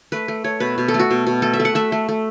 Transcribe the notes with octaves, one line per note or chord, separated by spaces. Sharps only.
A3 B4
A3
A3 C#5
B2 B4
B2
A4
A3
F#4
B2
B2
A3 A4
E5
A3
F#5
A3 E5
A3
A3